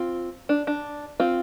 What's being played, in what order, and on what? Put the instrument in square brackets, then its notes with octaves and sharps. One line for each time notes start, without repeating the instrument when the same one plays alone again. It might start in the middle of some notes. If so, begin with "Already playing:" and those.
Already playing: [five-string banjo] C4 F4
D4
D4
C4 F4